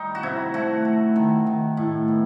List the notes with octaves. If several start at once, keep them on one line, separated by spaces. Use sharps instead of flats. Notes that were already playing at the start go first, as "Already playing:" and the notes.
Already playing: G3 D#4
F#4
C3 E4
A3 F#4
A3
D#3
D#3
A2
B3